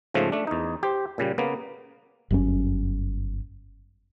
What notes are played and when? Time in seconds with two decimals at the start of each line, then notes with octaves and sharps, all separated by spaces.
0.14 G#2 C#3 F3 A3
0.32 A3 D4
0.47 E2 D#4
0.83 G4 C5
1.18 A#2 C#3 G3
1.38 C#3 A#3 B3
2.31 G1 F#2 C#4